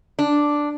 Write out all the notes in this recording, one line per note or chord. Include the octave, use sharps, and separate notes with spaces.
D4